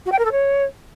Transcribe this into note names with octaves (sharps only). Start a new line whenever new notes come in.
F#4
G5
A#4
A4
C#5